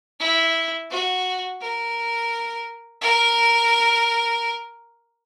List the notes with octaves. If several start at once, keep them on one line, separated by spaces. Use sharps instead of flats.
E4
F#4
A#4
A#4